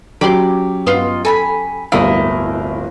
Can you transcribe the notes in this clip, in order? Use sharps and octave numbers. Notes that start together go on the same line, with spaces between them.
F#3 C#4 G4 B5 C6 D6
G2 B3 F4 D#5 C6
A4 G#5 A#5 B5
D1 G1 E3 G3 E4 A#4 D#5 F5